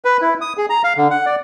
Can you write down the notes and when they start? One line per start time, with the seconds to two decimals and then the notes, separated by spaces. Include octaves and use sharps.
0.05 B4
0.21 E4
0.41 D#6
0.57 G#4
0.70 A#5
0.84 F5
0.97 D3
1.11 F#5
1.26 D5